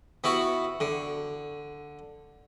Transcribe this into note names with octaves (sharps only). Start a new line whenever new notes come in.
B3 E4 F#4
D3